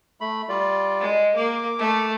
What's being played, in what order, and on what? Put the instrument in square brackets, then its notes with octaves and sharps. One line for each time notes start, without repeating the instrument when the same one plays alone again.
[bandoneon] A3 B5
G3 F4 D5
[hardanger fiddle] G#3
[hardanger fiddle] A#3 [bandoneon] D6
[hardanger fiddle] A3